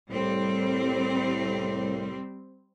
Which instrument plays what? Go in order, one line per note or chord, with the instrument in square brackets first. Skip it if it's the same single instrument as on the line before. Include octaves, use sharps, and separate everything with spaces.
[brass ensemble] C2 A2 [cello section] G3 C4